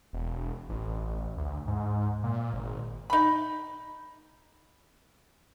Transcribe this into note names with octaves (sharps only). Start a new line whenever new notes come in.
E1
A1
D2
G#2
A#2
G#1
D#4 B5